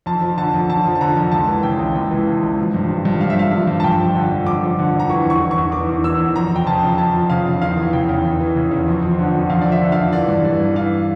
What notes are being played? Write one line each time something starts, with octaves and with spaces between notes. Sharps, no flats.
F2 A5
F3
D3 A5
F2
F2 A5
F3
A5
D3 A#5
F2
C#2 A5
E3
C#3 G5
C#2
C#2
E3
C#3
C#2
F3
G2
F3
G2
F3 F5
E5
G2 F5
F3
G2
A5
F2 G5
F3
D3
F2
F2 D6
F3
D3
F2
A#5
E3 C#6
E2
C#6
E3
C#6
E2
E3 D6
E2
E3 E6
E2
F2 A#5
F3 G5
C#3 A5
F2
F2 A5
F3
C#3 F5
F2
E2 F5
E3
C#3 G5
E2
E2
E3
C#3
E2
F2
F3
D3
F2
F2 F5
F3 D5
E5
D3
F5
F2
E3 D5
G2
E3 D5
G2
E3 F5